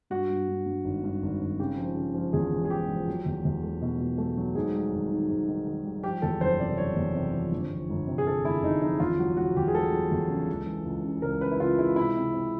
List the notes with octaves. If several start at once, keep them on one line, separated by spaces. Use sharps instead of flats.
G2 F#4
G2
G2
G2
G#1
G2
G#1
G#1
C#3 G4
F3
C#3
F3
E2 G#4
E1
G#4
F3 G4
F3
F#3
E2
E2
A3
B2
B2
A3
F#3
G#2 G#4
G3
G#1
D#3
G#2
D#3
D#3
G3
F3 G4
E2 A4
F#1 C5
C3 D5
F#1 C#5
E2
C3
F3
G1
F3
G1
C3
G#4
C3 A4
G1 E4
G1 D#4
F3 D#4
E2 F4
F#3 F#4
F#3 F#4
E2 G4
G#4
A3 A4
F#3
E2
C#3
C#2
E3
C#2
C#3
C#2 A#4
C#3 B4
E4
C#3 F4
G#3 E4
C3 E4
C3
C3